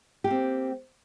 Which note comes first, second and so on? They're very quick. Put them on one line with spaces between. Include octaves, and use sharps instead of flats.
G4 A#3 C4